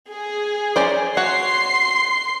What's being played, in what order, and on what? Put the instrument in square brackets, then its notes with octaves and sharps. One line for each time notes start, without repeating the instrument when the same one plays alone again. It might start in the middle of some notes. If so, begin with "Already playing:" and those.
[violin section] G#4
[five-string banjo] C#4 C5 D5
[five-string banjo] F#4 C#5 [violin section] C6 C7